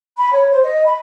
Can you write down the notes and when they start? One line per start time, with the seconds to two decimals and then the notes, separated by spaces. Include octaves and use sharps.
0.18 B5
0.33 C#5
0.50 C5
0.64 D#5
0.84 B5